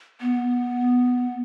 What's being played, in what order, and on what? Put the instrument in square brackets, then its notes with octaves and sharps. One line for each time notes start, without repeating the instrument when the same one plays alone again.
[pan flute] B3